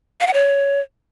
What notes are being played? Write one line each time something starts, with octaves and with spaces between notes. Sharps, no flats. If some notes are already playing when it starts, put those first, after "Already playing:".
F5
F#5
C#5